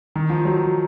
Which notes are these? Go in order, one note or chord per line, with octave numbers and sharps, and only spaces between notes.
D#3
F3
F#3